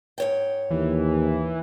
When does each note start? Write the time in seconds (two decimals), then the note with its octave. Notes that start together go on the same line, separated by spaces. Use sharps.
0.18 G#2 C#5 G5
0.70 D#2 E3